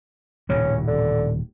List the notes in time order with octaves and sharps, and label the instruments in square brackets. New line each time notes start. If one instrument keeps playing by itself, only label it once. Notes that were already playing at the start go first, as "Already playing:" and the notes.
[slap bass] D#1 A2 C#3 [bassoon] C#4
[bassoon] D3